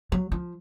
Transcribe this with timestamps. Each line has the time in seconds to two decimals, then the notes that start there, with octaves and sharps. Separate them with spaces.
0.12 F#3
0.32 F3